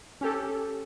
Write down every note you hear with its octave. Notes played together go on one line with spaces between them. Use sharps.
C#4 G4 A4